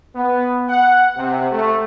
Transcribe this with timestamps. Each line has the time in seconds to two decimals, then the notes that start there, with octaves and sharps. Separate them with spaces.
0.15 B3
0.69 F#5
1.17 C3
1.51 A3